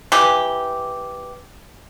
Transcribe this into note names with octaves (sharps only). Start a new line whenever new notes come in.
E3 G4